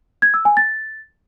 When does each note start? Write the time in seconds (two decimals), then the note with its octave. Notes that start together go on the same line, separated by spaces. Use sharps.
0.22 G#6
0.34 E6
0.45 G#5
0.57 A6